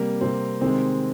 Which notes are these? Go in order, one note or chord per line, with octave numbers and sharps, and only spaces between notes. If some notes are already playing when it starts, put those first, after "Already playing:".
Already playing: C3 G3 A#3
C3 G3 C4
C3 D#3 G#3 C4